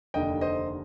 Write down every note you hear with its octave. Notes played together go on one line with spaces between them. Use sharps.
F1 D#2 D3 D#5 G5
C5 D#5